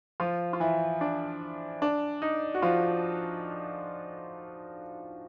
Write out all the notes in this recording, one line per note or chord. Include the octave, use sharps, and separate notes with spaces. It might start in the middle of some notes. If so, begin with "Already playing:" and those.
F3 F4
F4
E3 E4
D4
D4
D#4
F#4
F3 F4